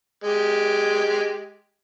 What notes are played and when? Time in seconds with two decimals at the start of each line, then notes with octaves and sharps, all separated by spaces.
0.24 G#3 G4